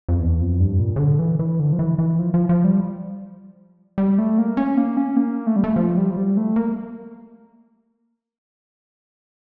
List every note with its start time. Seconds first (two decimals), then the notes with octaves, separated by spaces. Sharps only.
0.09 F2
0.20 E2
0.40 F2
0.60 G2
0.79 A#2
0.96 C#3
0.99 D3
1.19 E3
1.39 E3
1.59 D3
1.73 F3
1.79 E3
1.99 E3
2.19 F3
2.34 F3
2.49 F3
2.64 G3
3.98 G3
4.18 A3
4.38 A#3
4.57 C#4
4.77 A#3
4.97 C#4
5.17 A#3
5.47 A3
5.56 G3
5.64 A3
5.76 F3
5.97 G3
6.10 F3
6.17 G3
6.37 A3
6.56 A#3